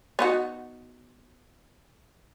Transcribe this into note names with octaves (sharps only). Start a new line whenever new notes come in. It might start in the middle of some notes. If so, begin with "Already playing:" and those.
B3 D#4 F#4